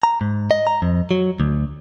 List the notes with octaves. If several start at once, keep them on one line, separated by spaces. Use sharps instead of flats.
A#5
G#2
D#5
A#5
F2
F#3
D2